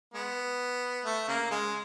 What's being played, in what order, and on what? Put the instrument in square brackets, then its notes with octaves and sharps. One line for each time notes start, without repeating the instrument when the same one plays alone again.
[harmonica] G#3 B3
A3
C#3 A#3
C#3 G#3